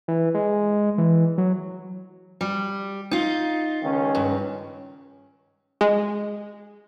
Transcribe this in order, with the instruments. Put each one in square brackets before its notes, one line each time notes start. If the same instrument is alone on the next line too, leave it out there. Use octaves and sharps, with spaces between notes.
[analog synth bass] E3
G#3
E3
F#3
[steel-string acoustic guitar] G3
D#4 F4
[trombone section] C#2 D#3 C#4
[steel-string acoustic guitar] G2
[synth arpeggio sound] G#3